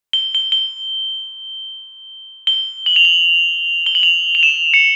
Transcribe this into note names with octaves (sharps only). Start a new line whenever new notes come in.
G7
G7
G7
G7
F#7
F7
F#7
G7
F#7
F7
F7
E7
C#7